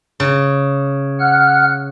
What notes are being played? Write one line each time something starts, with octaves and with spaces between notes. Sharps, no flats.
C#3
F#5 F6 F#6